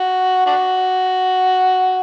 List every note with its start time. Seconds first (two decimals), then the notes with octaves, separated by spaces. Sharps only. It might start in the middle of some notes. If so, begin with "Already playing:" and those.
Already playing: F#4
0.46 D4 F#4